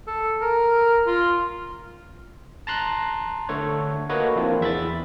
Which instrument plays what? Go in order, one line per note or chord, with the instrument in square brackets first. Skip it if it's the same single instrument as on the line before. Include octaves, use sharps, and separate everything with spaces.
[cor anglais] A4
A#4
F4
[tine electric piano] A5 A#5 C6 F#6
D3 A3 A4 C#5
A#3 F#4 A4 B4 C#5 D#5
F3 A#3 C4 D4 E4 F4
E2 E5 B5 A6